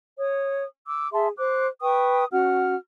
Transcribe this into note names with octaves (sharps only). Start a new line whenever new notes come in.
C#5 D#6
D6 E6
G#4 E5 A5 C6
C5 D6 F#6
B4 G5 C#6 D#6
C#4 F#4 F#5 F6